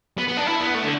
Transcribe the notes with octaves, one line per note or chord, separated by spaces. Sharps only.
B3
B3
D4
E4
B3
A3
D3